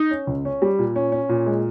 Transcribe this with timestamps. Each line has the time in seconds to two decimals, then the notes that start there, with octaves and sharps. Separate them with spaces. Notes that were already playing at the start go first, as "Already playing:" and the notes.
Already playing: D#4
0.11 C#4
0.27 C#2
0.45 C#4
0.62 G3
0.79 A#2
0.96 C#4
1.12 C#4
1.29 A#2
1.46 G#3